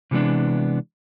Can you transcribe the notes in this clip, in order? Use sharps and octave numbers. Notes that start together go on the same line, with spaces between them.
C3 E3 G#3 B3 D4